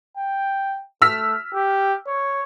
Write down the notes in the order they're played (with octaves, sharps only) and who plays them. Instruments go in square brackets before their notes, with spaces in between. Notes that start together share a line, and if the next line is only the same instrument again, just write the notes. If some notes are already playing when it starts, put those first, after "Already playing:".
[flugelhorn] G5
[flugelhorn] A3 [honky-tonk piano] E6 F6 B6
[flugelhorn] G4
C#5